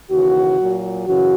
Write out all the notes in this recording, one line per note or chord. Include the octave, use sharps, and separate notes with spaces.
D#2 C#3 E3 F#4
A#2 F#3
F#2 C#3 E3 F#4